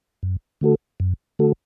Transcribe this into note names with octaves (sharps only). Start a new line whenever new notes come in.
F#2
D3 A3 F#4 A4
F#2
D3 A3 F#4 A4